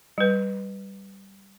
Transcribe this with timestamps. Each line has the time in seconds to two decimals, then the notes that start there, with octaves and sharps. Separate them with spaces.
0.18 G3 B4